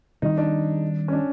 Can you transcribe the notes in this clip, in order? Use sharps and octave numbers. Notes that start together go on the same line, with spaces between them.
D#3 G3 C4 D#4
D4
C#4
D4